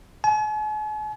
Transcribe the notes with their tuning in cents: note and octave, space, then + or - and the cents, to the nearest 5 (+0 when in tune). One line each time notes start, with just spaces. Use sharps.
G#5 +45